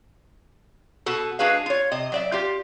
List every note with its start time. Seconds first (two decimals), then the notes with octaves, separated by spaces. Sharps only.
1.06 B2 F#4 A4
1.39 G#3 D4 F#4 G#4 B4 F5
1.66 F4 C#5
1.92 C3 D#5
2.12 F#3 D5 E5
2.32 F4 G4